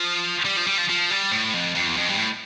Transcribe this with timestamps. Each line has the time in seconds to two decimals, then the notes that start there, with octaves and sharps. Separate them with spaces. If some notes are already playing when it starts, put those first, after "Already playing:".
Already playing: F3
0.45 G3
0.57 F3
0.67 G3
0.78 F3
0.89 F3
1.10 G3
1.32 A2
1.54 F2
1.75 F2
1.87 E2
1.97 F2
2.08 G2
2.17 A2